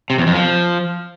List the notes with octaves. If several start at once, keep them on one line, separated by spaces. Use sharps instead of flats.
C3
E2
F2
F3